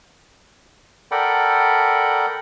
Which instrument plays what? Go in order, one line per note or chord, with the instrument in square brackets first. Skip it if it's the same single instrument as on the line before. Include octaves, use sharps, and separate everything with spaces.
[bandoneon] A4 A#4 D5 F#5 G5 B5